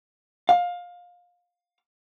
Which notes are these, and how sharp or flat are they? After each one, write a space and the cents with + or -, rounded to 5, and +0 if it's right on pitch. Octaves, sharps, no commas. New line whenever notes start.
F5 +20